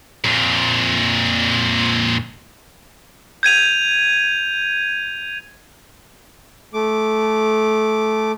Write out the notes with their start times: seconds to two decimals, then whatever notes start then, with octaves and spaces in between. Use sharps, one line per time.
0.24 F2 A#2
3.43 G6 G#6 D#7 F7
6.74 A3 D6